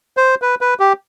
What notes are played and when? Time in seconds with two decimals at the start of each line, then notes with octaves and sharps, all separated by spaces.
0.17 C5
0.42 B4
0.61 B4
0.79 G4